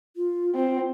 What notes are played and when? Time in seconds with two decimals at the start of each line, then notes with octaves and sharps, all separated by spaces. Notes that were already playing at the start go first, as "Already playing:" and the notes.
0.16 F4
0.55 C4 F4